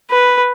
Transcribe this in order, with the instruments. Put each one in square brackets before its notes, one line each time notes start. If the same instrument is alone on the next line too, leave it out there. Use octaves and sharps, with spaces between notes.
[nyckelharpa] B4